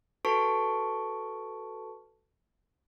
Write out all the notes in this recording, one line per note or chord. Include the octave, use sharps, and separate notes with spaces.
F#4 A4 B4 A5 C#6 D7